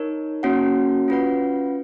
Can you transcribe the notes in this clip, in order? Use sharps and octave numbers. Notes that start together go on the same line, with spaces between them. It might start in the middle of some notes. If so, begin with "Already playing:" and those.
Already playing: D#4 A#4 C#5
A#3 C#4 F#4 C#5 F#5
C#4 F4 B4 F#5